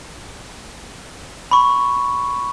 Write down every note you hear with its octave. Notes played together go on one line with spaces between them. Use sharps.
B5 C#6